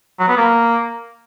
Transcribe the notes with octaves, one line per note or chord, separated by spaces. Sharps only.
F#3
B3
A#3